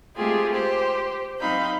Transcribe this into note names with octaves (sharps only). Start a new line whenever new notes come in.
G#3 A3 C4 F4 G4 G#4
G4 C5
F#3 C4 D#4 F5 B5 G6